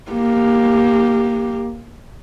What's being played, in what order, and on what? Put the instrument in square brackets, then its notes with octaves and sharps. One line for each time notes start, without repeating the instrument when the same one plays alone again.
[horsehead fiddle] A#3 G4